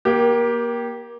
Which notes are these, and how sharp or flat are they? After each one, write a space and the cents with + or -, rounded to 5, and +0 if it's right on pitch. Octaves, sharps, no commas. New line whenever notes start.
A#3 +25 G4 -5